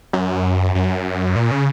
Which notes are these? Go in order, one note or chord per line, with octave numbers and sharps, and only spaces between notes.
F#2
F#2
A#2
C#3